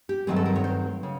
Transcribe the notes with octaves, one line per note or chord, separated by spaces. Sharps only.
G4
G2 D#3 F#3 A3 C4 G#4
A4
A#4
C#5
C5
C#3